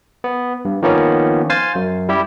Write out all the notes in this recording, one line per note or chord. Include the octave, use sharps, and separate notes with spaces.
B3
G2
D#3 F3 A#3 B3 C#4
C5 F5 G#5 A6
F#2
G3 E4 G4